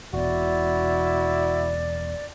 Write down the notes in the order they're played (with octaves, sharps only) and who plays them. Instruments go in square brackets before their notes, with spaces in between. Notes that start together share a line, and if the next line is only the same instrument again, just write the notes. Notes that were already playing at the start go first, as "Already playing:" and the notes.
[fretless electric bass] E1 B2 [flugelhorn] E4 [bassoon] F#4 [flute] D5